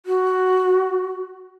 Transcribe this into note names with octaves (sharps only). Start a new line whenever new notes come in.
F#4